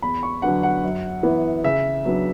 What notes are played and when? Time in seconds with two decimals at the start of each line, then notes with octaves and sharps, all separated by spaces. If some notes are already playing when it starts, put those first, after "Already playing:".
0.02 E2 B5
0.23 C#6
0.42 D3 F#3 B3 D4 F#5
0.63 F#5
0.84 F#2
1.23 E3 B3
1.64 C#3 E5
2.05 F#3 B3 D4